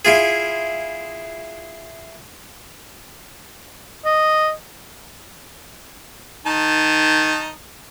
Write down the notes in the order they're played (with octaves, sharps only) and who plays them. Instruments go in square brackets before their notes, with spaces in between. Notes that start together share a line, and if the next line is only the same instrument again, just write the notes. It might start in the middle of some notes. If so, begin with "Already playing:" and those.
[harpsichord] E4 F4 G#4
[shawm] D#5
[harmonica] D#3 D#4 A5